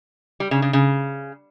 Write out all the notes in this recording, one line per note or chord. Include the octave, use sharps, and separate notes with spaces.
G3
C#3
C#3
C#3